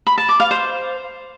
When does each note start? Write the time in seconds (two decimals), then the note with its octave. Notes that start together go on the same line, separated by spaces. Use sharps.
0.07 B5
0.18 A5
0.29 D6
0.40 F5
0.51 C5